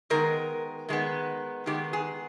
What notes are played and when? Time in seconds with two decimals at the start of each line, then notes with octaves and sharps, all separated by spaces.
0.10 D#3 G#3 B3 A#4
0.89 D#3 G#3 B3
1.66 D#3 G#3 B3 G4
1.93 G#4